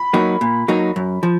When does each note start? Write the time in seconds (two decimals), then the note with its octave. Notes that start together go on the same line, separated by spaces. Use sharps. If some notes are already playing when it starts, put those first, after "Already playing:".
Already playing: B5
0.13 F#3 A#3 D#4 F#4
0.41 A#2
0.68 F#3 A#3 D#4 F#4
0.96 F#2
1.23 F3